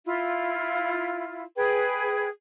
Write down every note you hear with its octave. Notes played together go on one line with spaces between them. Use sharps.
E4 F4
G#4 B4 G5 G#6